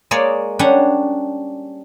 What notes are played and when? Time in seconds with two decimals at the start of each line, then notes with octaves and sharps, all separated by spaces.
0.11 G#3 A#3 C#5 D5
0.59 G3 C#4 D4 F#5